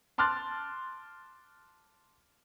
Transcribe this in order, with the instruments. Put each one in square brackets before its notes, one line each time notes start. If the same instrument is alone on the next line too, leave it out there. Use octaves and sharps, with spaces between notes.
[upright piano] A5 C6 D6 F6 F#6 A6